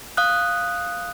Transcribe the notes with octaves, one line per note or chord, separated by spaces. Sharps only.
F5 D#6 F#6